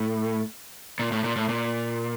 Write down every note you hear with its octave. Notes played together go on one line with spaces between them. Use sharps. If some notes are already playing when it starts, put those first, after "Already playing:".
Already playing: A2
A#2
A2
A#2
A2
A#2